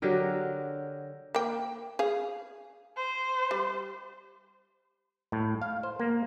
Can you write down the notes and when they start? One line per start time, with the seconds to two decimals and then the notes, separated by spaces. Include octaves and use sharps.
0.02 D3 F#3 G4 A#4
1.35 A#3 G5
1.99 G#4 F5
2.97 C5
3.51 G3
5.32 A2
5.62 F5
5.83 C5
6.00 A#3